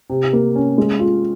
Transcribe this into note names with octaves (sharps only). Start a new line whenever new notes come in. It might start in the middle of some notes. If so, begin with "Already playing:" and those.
C3
A#3
C#4
G#3
F4